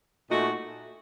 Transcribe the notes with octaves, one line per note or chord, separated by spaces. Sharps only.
A#2 A3 D#4 F#4